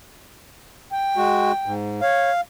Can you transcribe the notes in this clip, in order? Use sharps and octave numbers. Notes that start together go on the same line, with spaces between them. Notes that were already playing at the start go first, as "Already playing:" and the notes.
G5
G#3 F#4
G#2
C#5 F5